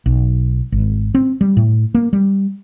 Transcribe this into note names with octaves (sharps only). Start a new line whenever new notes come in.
B1
G#1
C4
G3
A2
A#3
G3